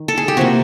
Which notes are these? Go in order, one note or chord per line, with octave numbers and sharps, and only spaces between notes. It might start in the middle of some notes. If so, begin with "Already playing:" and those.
Already playing: D#3
A4
G#4
G4
C3 F3 A#3 F#4